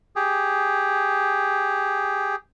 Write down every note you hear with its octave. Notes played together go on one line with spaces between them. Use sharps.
G4 G#4